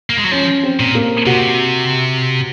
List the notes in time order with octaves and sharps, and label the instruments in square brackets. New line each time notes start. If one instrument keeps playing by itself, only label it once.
[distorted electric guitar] A#3
G#3
F#3
[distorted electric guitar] F3 [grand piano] C#4
[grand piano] C4
[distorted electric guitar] A#2
[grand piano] A#3
[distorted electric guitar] C3 [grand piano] F#4